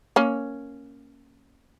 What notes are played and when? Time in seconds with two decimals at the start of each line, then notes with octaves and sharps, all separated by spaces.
0.16 A#3 C#4